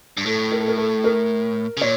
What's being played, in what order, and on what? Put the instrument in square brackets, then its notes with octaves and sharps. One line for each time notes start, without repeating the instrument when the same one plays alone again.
[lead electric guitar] G2
[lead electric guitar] A2 [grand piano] A4
[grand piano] A#4
A4
A#4
A4
A#4
[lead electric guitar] C#3
[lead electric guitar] A#2 [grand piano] C#5